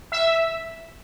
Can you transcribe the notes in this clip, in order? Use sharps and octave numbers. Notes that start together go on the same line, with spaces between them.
E5